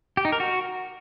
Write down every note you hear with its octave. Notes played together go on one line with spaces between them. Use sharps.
G4
D#4
A#4
F#4